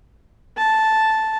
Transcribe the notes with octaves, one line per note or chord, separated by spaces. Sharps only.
A5